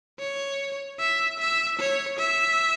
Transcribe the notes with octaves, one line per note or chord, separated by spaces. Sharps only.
C#5
E5
E5
C#5
E5